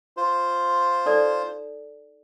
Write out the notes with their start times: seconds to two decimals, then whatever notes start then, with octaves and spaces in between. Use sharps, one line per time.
0.17 F4 C5
1.06 D#4 A4 D5